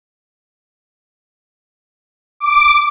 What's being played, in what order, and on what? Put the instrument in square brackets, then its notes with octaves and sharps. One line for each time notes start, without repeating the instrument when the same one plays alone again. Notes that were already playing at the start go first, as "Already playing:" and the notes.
[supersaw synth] D6